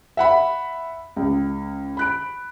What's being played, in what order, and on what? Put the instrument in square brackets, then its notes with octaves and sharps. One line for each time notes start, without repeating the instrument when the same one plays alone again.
[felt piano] E5 F#5 B5
C#2
B5 F#6 D7